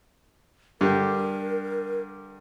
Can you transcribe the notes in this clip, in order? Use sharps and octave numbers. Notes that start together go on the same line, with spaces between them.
G2 D3 G4 A#4